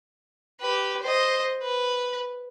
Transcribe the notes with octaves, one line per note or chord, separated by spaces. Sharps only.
G4 B4
C5 D#5
B4